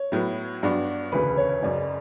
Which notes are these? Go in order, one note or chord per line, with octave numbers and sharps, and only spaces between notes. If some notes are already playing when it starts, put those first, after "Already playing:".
Already playing: C#5
A2 F#3 B3
G2 F#3 B3 D4 F#4
E1 D2 C#3 B4
C#5
F#1 F#2 C#3 D5